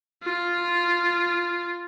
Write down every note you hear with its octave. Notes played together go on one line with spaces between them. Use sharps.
F4